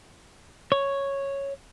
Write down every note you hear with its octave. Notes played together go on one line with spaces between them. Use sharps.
C#5